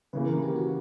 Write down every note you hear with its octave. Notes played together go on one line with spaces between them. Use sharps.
C#3 E3 A#3 B4
A#4
G4
F#4